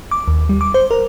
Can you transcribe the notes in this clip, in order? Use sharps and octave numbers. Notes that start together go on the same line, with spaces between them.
D6
D#2
G3
D6
C5
A#4